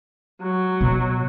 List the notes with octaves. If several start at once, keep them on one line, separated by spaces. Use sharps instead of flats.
F#3
B2